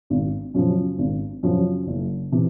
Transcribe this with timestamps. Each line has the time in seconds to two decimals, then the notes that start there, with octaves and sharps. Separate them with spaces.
0.10 G#1
0.54 F#2 C#3 F3
0.98 G#1
1.43 F#2 C#3 F3
1.87 F#1
2.32 C3 E3